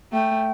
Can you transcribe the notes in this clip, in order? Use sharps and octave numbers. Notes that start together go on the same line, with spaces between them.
A3 G5